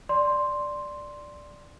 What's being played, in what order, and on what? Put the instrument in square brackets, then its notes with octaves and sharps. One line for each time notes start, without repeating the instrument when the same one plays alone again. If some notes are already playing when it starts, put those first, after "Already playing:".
[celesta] D5 C6